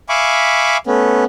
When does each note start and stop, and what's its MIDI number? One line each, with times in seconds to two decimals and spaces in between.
0.09 0.77 76
0.09 0.77 77
0.09 0.77 80
0.09 0.77 83
0.09 0.77 85
0.09 0.77 86
0.87 1.24 57
0.87 1.24 59
0.87 1.24 61